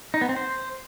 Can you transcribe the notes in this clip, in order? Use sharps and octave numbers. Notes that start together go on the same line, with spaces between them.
D#4
B3
C4
C5